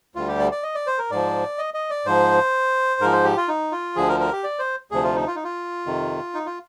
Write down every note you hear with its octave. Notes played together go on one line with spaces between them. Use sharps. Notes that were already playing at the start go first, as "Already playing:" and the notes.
D2 D3 G3 F4
G4
D5
D5
D#5
D5
C5
A#4
G#2 F3 D5
D#5
D#5
D5
G#2 F3 C5
G#2 F3 A#4
C5
G4
F4
D#4
F4
D2 D3 F3 G#4
A#4
A#4
G4
D5
C5
D2 C3 F3 G#4
F4
D#4
F4
D#4
F4
F2 C3 D#3
D#4
F4